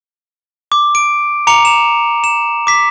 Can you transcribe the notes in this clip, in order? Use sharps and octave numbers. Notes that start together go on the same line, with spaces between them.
D6
D7
A#5 D6 C#7 F7
E7 F7
E7
D6 B6